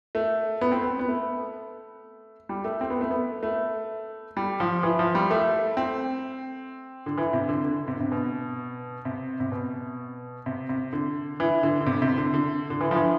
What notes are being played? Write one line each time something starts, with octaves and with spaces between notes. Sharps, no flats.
A3
B3
C4
B3
B3
A3
G3
A3
C4
B3
A3
B3
A3
G3
F3
E3
F3
G3
A3
C4
D3
E3
C3
D3
D3
C3
C3
B2
C3
C3
B2
C3
C3
D3
E3
D3
D3
C3
C3
D3
D3
D3
E3
F3
E3